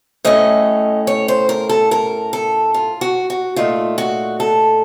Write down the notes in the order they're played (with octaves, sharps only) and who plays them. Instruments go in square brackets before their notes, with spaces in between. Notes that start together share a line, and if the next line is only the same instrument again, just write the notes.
[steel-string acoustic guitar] A2 A3 C#4 D#5
C#5
C5
A#4
A4
A#4
A4
F4
F#4
F#4
A#2 A3 D#4 F4
F#4
A4